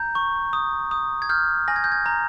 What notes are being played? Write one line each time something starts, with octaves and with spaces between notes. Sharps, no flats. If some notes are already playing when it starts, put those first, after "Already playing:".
Already playing: A#5 G6
C#6
D#6
D#6
G#6
F6 G6
G#5 A#6
G#6
G6
G#6
A#5